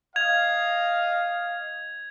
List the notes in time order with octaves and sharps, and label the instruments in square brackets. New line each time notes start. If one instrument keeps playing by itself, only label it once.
[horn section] D#5 F5 [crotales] G#6 F7